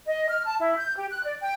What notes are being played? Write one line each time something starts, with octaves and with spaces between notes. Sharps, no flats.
D#5
F6
A5
E4
G6
G4
F#6
D5
G5